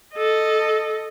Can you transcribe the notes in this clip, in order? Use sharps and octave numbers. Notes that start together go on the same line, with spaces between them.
A4 D#5